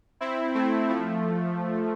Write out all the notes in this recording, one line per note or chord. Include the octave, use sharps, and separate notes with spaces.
C4 E4
A3 C4
F3 A3